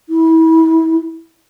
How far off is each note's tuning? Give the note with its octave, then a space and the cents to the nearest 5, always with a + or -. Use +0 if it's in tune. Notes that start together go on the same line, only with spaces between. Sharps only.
E4 -30